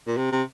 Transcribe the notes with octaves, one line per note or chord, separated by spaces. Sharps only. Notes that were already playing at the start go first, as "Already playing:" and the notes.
A#2
C3
C3